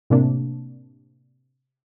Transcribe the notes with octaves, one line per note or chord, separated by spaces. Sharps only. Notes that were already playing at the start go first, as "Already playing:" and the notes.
A2 C3 A#3 D4